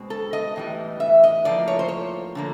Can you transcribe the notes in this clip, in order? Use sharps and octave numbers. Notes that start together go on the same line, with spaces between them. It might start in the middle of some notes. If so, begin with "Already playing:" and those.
Already playing: B2 G#3 C4
A4
D#5
A2 E3 G3
E5
D#5
A2 F3 A#3 D5
C#5
C5
C#5
D3 F3 A#3